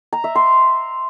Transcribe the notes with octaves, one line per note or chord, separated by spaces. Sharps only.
A#5
E5
C6